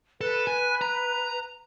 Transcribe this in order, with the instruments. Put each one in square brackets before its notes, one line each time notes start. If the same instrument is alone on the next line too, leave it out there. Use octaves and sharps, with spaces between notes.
[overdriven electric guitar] A4 [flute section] B4
[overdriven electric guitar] G#5
A#5